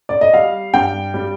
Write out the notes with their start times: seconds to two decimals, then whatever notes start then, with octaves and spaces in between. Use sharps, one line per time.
0.09 D5
0.21 D#5
0.34 G3 F5
0.74 G2 G5
1.14 G3